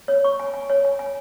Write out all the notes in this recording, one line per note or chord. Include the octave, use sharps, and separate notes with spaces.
C#5
C#6
G#5
G#5
C#5
G#5
G#5